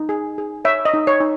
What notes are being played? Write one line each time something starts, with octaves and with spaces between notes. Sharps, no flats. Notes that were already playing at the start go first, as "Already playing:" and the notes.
Already playing: D#4
G#4
G#4
C#5 E5
D#5
D#4
C#5
D#4